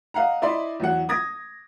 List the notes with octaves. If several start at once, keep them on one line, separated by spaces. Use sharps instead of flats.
D#5 F5 F#5 A#5
E4 D5 D#5 B5 C6
E2 F#3 F#5
D#6 G#6 A#6